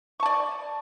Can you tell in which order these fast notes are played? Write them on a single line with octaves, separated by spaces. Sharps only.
C#6 A5 D5